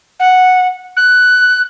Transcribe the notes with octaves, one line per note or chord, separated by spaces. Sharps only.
F#5
F#6